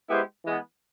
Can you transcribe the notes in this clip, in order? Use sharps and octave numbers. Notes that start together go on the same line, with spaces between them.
G#3 B3 E4 G4 C5
E3 G#3 B3